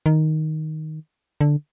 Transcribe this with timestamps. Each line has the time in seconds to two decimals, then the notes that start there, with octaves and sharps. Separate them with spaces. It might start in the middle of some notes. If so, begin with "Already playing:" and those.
0.06 D#3
1.41 D3